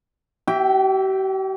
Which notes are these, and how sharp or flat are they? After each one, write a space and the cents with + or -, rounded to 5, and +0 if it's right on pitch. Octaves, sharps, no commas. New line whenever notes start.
G4 -45 E5 +0 G5 +0